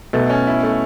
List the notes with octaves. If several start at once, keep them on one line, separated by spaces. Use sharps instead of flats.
B1 B2 A3
C#4
E4
A3